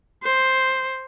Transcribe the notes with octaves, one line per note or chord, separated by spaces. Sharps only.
C5